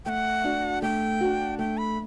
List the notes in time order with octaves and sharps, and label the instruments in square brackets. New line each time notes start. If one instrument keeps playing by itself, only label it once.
[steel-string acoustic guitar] A3 [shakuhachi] F#5 G5
[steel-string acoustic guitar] D4 F#4
[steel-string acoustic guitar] A3 [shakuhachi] G5
[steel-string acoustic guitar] D4 F#4
[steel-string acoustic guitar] A3 [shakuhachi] G5
[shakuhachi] B5